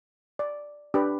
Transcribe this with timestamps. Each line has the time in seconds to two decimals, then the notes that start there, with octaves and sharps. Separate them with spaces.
0.39 D5
0.94 D4 G4 B4